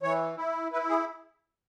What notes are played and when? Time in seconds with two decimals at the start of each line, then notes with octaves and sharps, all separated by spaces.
0.02 E3 C#5
0.37 E4
0.72 E4 B4
0.89 G#4